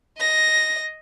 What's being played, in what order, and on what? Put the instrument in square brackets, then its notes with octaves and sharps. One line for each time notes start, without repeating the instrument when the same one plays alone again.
[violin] D#5 A#6